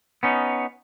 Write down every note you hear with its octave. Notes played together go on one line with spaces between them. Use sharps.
B3 C#4 D#4